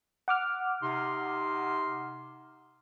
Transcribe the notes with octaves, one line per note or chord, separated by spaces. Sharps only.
F#5 D6 F6
C3 D#4 C6